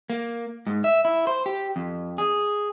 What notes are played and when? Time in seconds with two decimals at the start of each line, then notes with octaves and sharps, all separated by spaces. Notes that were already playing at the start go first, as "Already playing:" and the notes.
0.10 A#3
0.67 G#2
0.84 E5
1.05 E4
1.27 C5
1.46 G4
1.76 F2
2.18 G#4